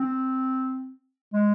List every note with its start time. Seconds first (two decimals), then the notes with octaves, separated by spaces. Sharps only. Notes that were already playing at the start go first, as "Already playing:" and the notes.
Already playing: C4
1.33 G#3